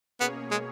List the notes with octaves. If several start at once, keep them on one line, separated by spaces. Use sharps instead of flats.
B2 A#3 B3 C#4 G#4 C#5
G#3